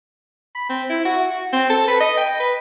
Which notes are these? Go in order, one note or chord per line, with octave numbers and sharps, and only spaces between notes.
B5
C4
E4
F#4
F#4
C4
A4
B4
D#5
G5
B4